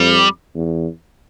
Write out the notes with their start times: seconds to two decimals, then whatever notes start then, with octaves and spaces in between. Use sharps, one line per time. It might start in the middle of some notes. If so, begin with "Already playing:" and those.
Already playing: F2 G3
0.54 E2